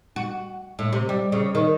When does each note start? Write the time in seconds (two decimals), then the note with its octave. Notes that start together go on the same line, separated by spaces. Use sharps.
0.16 F#4
0.79 A2
0.93 C3
1.09 G3
1.32 C#3
1.55 D#3